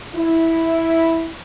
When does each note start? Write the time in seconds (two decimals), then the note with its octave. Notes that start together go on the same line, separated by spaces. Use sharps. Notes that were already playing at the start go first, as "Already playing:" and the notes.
0.15 E4